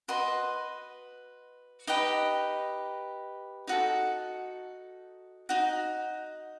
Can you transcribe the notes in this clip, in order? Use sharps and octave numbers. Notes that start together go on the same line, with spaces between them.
F#4 B4 D#5 C6
D#4 G4 B4 D#5
D#4 F#4 A4
D#4 F#4